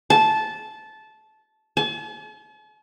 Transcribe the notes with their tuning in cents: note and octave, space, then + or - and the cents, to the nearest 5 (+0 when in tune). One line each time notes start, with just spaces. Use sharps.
A5 -15
A5 -45